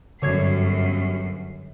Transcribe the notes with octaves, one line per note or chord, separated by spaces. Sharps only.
G1 F#2 D3 C#5 G#6 C7